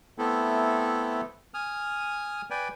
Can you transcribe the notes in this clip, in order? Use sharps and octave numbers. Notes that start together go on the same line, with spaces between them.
A3 B3 C4 E4 A4
G#5 D#6 F6
B4 D5 G5 G#5